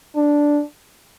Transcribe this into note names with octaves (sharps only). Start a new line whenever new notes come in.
D4